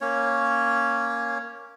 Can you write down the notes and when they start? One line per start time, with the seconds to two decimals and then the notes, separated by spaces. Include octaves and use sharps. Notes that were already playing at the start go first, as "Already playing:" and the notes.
0.01 A#3 C#4 C#5